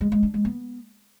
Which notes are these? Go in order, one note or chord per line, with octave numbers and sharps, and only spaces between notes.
G#3
G#3
D4
G#3
B3